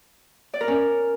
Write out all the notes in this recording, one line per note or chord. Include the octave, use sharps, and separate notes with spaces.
D5
A#4
C#4